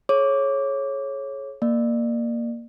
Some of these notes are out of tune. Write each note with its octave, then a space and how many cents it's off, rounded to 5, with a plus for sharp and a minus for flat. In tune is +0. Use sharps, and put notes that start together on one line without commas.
G#4 +40 C#5 -15 D6 -10
A#3 +0 D5 +35